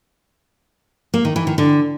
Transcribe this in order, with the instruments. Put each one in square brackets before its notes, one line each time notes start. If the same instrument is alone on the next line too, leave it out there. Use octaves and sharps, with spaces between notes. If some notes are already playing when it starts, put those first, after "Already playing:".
[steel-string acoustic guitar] A#3
D#3
E3
D#3
D3